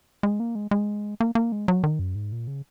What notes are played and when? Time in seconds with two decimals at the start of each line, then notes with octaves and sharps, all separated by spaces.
0.23 G#3
0.40 A#3
0.55 G#3
0.71 G#3
1.20 A#3
1.35 A#3
1.52 G#3
1.68 F#3
1.84 D#3
1.99 F#2
2.15 G#2
2.32 A#2
2.47 C#3